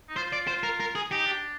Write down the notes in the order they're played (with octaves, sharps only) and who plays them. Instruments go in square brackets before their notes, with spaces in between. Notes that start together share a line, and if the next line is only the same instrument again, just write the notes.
[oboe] D#4
[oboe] F4 [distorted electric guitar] C5
[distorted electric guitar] D5
C5
A#4
A#4
G#4
[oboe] D#4 [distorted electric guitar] G4
[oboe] D4